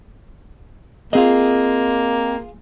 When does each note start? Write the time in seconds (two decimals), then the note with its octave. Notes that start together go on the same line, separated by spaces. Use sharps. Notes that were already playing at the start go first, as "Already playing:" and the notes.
1.13 A#3 C4 F4 G#4 D#5